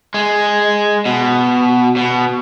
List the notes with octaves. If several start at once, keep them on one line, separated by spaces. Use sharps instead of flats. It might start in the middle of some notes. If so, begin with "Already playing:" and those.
G#3
B2
B2